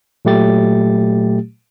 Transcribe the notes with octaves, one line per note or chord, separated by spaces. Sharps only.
A#2 F#3 A3 G4 A6